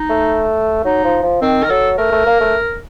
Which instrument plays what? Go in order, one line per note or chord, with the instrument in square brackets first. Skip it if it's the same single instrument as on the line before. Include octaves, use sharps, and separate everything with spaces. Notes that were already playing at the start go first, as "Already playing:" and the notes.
Already playing: [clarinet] D#4
[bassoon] A3
[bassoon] F#3 [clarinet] D#4
[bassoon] F3
F3
[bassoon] D#3 [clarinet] C4
[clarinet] A#4
[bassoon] F#3 [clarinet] A4
[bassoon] A3 [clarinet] A#4
[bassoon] A3
A#3
A3